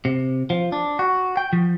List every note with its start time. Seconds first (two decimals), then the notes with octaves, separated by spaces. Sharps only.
0.05 C3
0.50 F3
0.72 D4
0.99 F#4
1.37 G5
1.53 F3